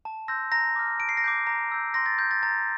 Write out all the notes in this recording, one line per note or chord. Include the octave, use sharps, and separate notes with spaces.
A5
C6 E6 G6 A#6
A#5 A#6
D6 F6
A5 D7
C7
A#6
D6 G6 C7
A#5 A#6
E6 G6
C6 A#6
A6
G6
A6
A#5 A6